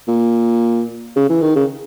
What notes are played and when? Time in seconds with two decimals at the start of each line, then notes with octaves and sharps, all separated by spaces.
0.08 A#2
1.16 C#3
1.30 E3
1.42 D#3
1.56 C#3